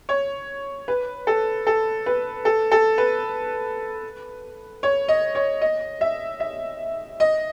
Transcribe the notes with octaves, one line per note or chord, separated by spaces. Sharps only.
C#5
B4
A4
A4
B4
A4
A4
B4
C#5
D#5
C#5
D#5
E5
E5
D#5